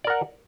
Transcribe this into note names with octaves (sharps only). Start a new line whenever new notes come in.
A#4 D5 F#5